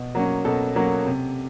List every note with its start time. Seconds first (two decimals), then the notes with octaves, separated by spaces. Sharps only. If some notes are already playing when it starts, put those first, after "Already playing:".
Already playing: B2
0.15 F#3 A#3 C#4
0.45 B2 A4
0.76 F#3 A#3 C#4
1.06 C3